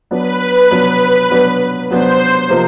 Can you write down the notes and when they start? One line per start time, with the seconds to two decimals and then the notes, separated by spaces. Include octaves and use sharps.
0.11 F#3 B3 D4 B4
0.71 F#3 B3 D4
1.30 F#3 B3 D4
1.89 F#3 B3 D4 C5
2.49 C3 F3 A#3 D#4